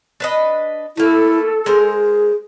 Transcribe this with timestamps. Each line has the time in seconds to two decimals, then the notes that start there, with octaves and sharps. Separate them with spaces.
0.20 D4 B4 D#5
0.97 A3 A#3 E4 A4
1.66 G#3 G#4 A#4 C5